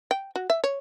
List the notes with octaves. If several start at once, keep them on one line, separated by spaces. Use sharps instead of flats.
G5
F#4
E5
C#5